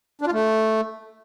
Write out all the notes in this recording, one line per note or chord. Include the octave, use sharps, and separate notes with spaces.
D4
F4
A3